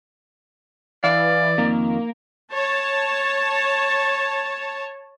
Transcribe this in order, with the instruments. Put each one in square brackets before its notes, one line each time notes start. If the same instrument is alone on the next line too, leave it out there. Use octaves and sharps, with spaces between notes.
[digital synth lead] E3 [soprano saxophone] D5 [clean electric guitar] F5
[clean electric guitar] F2 D#3 [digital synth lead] A#3
[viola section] C#5 A5